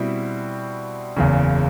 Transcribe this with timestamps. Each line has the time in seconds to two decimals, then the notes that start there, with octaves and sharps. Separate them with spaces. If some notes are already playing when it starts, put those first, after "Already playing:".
Already playing: B2 G3 C4 E4
1.17 F#1 E2 C#3